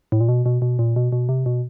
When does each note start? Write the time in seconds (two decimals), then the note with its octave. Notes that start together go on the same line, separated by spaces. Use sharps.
0.12 A2
0.20 A#2
0.28 B2
0.46 B2
0.62 B2
0.79 A#2
0.96 B2
1.12 B2
1.29 C3
1.46 B2